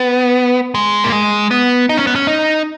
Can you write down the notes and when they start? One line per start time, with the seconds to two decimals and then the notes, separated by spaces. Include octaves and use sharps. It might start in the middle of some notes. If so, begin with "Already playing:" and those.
Already playing: B3
0.75 G#3
1.04 A#3
1.12 G#3
1.51 B3
1.89 D#4
1.97 C#4
2.07 B3
2.16 C#4
2.27 D#4